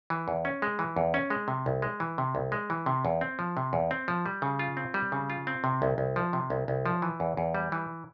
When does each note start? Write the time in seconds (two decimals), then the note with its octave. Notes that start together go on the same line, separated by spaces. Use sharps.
0.10 E3
0.28 E2
0.45 C#4
0.62 G#3
0.79 E3
0.96 E2
1.14 C#4
1.30 G#3
1.48 C3
1.66 C2
1.82 G#3
2.00 E3
2.18 C3
2.35 C2
2.52 G#3
2.70 E3
2.86 C3
3.05 E2
3.21 C4
3.39 F3
3.57 C3
3.73 E2
3.91 C4
4.08 F3
4.26 G3
4.42 C#3
4.59 F4
4.77 C4
4.94 G3
5.12 C#3
5.30 F4
5.47 C4
5.64 C3
5.82 C2
5.98 C2
6.16 F3
6.33 C3
6.50 C2
6.68 C2
6.86 F3
7.02 E3
7.20 E2
7.37 E2
7.55 G3
7.72 E3